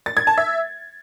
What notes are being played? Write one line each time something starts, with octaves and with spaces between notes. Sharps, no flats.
A6
G#6
A5
E5